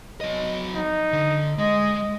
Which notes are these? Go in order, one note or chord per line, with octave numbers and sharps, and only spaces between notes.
F#3 D#5
D#4
D3
G#3 D#5